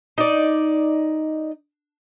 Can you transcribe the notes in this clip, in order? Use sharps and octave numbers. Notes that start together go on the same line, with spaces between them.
D#4 D5